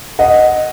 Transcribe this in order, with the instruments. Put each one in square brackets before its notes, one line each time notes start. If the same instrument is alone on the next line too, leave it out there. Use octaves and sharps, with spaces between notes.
[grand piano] D#5 F#5